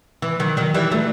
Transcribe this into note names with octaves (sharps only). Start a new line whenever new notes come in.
E3
D#3 F#3
D#3 F#3
E3 G3
F#3 A3